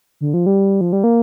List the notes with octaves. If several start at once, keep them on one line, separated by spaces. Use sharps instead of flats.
D3
F3
G3
F3
G3
A#3